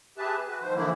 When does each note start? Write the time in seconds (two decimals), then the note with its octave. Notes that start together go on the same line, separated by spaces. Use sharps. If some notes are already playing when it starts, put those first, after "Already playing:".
0.18 G4 G#4 B4 E5 A5
0.48 F#4 B4
0.61 G#2 D#3 F3 C5
0.75 D3 E3 F3 A#3 E4